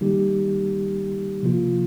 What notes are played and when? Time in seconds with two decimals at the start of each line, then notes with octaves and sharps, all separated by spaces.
0.01 D#3 G3 A#3 D#4 G4
1.43 C3 F3 A#3 F4